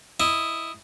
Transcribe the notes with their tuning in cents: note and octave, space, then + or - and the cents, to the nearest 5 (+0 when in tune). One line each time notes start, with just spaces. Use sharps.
E4 +0 D#5 +0